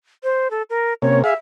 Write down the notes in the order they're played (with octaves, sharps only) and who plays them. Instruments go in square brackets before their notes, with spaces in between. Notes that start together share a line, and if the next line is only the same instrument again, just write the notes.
[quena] C5
A4
A#4
[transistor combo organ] C3 A#3 C#4 [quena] C#5
[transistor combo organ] G#4 F5 [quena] E5